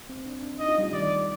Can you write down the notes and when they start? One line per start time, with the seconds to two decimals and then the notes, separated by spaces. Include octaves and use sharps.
0.09 C4
0.26 D4
0.43 D4
0.59 D#4 D#5
0.68 F4
0.78 G3
0.85 A3
0.93 D#3 D5